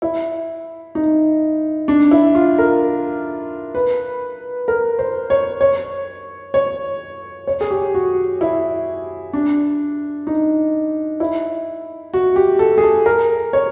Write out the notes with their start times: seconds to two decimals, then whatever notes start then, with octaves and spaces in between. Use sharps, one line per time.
0.02 E4
0.95 D#4
1.88 D4
2.11 E4
2.35 F4
2.59 A#4
3.75 B4
4.68 A#4
4.99 C5
5.30 C#5
5.61 C#5
6.54 C#5
7.47 C#5
7.61 G#4
7.70 G4
7.94 F#4
8.41 E4
9.33 D4
10.27 D#4
11.20 E4
12.14 F#4
12.36 G4
12.59 A4
12.78 G#4
12.84 A4
13.06 A#4
13.53 C#5